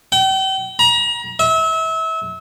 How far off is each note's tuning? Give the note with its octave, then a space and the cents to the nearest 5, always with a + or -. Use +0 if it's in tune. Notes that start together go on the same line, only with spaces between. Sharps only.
G5 -40
A#5 +35
E5 -30